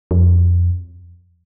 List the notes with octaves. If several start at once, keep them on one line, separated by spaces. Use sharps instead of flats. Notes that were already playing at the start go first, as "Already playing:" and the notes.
F2